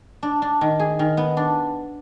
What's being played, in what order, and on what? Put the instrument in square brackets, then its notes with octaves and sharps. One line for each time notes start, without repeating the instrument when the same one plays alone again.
[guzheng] D4
D4
D#3
G#4
D#3
B3
D4